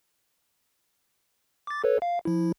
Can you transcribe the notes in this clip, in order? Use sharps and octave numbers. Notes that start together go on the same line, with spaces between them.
D6 A6
A4 B4 C#5
F5
F3 E4